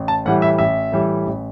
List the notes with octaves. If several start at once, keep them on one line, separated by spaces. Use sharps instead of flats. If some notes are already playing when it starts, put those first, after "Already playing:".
Already playing: A1
A5
A2 E3 G3 F#5
E5
A1 E5
A2 E3 G3
A1